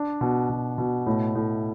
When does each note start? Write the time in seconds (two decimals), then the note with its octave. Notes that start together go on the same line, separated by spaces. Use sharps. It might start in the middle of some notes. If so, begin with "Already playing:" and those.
Already playing: D4
0.21 B2
0.49 B2
0.78 B2
1.06 A2
1.35 A2